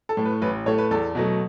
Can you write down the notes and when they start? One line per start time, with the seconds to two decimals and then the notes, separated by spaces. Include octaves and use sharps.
0.09 A4
0.17 A2 A3
0.25 B4
0.42 A1 B4
0.66 A2 A3 C#5
0.78 B4
0.91 E2 A4
1.15 B2 F#3 A3